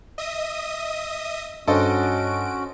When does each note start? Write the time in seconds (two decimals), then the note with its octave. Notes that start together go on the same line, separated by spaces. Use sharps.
0.18 D#5 E5 D#6
1.68 G2 C#4 D4 F#4 A4 C5 D#5 D7